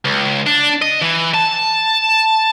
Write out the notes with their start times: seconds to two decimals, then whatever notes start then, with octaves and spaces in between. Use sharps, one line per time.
0.05 C#2
0.47 D4
0.82 D#5
1.02 E3
1.34 A5